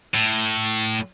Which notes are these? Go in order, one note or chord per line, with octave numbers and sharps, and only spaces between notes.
A2